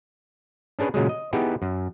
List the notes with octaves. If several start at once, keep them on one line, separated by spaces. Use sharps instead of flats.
C#4 D4 G#4 B4 C#5
A#2 C#3 F#3 G#3
D#5
B3 D#4 E4 G4 G#4
F#2